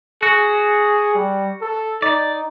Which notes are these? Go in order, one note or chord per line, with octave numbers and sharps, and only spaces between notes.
F#4 G#4
G3
A4
D#4 D5